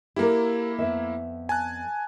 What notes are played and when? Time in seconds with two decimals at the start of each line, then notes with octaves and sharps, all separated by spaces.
0.16 A#3 E4 G4 A4 A#4
0.78 F2 B3 E5
1.49 G#5 A5 F#6